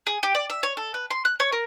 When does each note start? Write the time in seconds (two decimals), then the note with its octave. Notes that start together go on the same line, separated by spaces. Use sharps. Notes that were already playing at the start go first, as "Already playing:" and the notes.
0.07 G#4
0.23 G4
0.35 D5
0.50 E5
0.63 C#5
0.77 A4
0.94 B4
1.11 C6
1.25 F#6
1.40 C#5
1.52 A#4